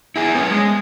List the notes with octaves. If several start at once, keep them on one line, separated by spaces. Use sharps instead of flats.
E4 G#4
B3 C#4
G#3